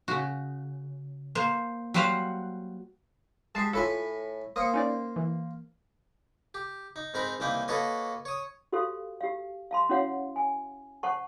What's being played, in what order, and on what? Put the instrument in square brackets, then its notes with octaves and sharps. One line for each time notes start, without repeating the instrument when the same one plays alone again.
[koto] C#3 F#4
A#3 C5
F#3 G3 F#4 C5 F5 F#5
[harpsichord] G#3 G4 [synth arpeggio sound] A5 A6 C7
[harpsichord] A2 B4 G#5 [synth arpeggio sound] F4 A4
[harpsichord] A#3 C5 [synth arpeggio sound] D#6 C#7
[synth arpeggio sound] C#4 D#4 D5
E3
[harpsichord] G4
D#4
G#2 C4 D#4 A#4 B5
C2 E3 A#3 D#4 G5 B5
A#3 F#4 A4 B4 C#5 D#5
C#5 D#6
[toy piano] F#4 G4 A4 C5 F5
G4 F5
F5 A5 C6
C#4 E4 F#4 C#5 F5 F#5
G#5
C5 F#5 A5 C#6